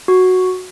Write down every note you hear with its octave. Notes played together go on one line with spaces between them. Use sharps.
F#4